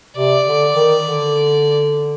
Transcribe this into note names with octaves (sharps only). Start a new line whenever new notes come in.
C3 D5
D3
D#3
D3